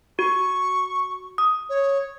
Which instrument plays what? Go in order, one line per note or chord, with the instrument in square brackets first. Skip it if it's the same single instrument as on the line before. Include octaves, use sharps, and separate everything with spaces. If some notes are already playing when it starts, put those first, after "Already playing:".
[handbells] F#4 [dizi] C#6
[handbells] D#6
[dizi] C#5